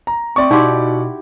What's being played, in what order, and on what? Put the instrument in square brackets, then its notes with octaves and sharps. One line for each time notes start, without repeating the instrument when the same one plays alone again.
[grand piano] A#5
[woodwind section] A3 C4 [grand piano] D5 C#6
[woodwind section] B2 [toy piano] D#4 C6 [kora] E4 F#4 G4